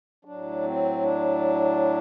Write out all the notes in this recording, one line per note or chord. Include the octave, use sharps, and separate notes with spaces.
A2 F#3 D4
C4
D4